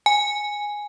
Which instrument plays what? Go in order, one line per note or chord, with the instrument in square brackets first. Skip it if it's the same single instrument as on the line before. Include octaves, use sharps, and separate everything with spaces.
[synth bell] G#5